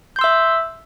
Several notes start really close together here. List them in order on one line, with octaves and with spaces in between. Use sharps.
G6 C6 E6 E5